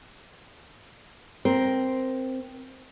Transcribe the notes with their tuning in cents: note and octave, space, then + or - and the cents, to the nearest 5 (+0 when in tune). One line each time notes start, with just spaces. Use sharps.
C4 +0 A#4 +10